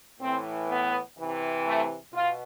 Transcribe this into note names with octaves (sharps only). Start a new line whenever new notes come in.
A2 E3 C4
B3
C3 E3
A3
B2 F4